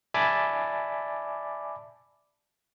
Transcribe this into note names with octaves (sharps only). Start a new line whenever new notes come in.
D5 E5 G#5 A5 B5 D6